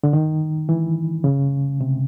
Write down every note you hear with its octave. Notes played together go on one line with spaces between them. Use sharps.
D3
D#3
E3
C#3
C3